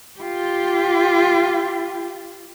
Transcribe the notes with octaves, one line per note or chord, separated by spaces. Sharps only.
F4 G4